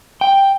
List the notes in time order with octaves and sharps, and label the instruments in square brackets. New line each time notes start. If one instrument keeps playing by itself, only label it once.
[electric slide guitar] G5